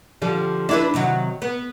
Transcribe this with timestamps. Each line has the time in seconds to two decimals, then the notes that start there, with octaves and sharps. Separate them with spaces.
0.22 D3 F3 G3
0.69 D4 E4 B4
0.94 C3 D#3 F#3
1.42 B3